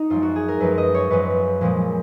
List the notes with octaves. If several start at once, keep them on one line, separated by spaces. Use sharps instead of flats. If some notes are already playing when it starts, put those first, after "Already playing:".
Already playing: D#4
F#2 F3 G#3 F4
F#4
G#4
A#4
F#2 F3 G#3 B4
D#5
C#5
F#2 F3 G#3 B4
A#2 F3 G#3